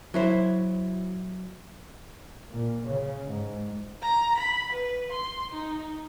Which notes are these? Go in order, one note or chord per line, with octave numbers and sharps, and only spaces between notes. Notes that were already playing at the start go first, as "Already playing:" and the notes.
F#3 E4 C5
A#2
C#3
G#2
A#5
B5
B4
C6
D#4